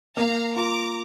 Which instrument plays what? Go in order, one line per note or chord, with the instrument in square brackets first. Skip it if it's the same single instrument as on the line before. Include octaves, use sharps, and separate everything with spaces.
[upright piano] A#3 [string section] F5 A#5
[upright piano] F4 [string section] A#5 D6